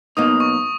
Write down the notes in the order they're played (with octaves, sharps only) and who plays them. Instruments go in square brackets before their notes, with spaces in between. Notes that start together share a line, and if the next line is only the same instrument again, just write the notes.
[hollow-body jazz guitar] B1 B2 A#3 D#4 [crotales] D#6
[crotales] C#6